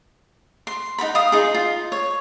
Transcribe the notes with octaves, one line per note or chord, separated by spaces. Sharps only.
C6
D#4 A#4 F#5 B5
F5 D#6
D#4 F4 G#4
F4
C#5